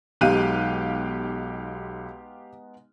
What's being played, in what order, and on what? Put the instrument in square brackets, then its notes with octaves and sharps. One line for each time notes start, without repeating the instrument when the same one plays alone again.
[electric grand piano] B1 F#6 D#7 [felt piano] G#3 B3 D#4 [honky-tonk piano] G4 F5